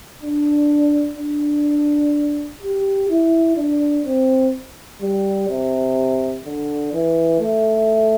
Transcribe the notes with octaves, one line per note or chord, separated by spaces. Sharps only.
D4
D4
G4
E4
D4
C4
G3
C3
D3
E3
A3